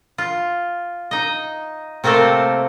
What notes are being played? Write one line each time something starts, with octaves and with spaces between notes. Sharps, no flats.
F4
D#4 D#5
C3 A3 A#3 C4 A4